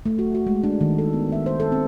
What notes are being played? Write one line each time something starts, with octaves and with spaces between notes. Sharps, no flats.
A3
F#4
F#4
G#3
D4
D#3
A4
B3
E5
C5
A4
C4